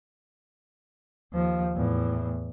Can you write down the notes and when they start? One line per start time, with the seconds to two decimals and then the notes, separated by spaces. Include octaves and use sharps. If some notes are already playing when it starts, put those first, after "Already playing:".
1.33 D#2 F3
1.76 E2 A2